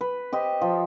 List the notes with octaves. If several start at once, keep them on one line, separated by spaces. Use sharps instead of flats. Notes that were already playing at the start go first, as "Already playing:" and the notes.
B4
G4 C5 D#5
F3